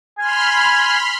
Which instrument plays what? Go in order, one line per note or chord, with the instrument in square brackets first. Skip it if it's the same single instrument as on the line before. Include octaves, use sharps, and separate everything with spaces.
[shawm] G#5 [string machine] B5 C6 F6